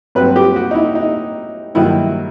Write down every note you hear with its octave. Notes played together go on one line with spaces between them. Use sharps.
G2 F#3 C4 B4
G4
F#4
D#4
E4
D#4
G2 D#3 F#3 E4